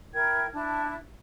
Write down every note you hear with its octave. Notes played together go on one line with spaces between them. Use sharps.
E4 A#4 G5 G#6
D4 E4 A5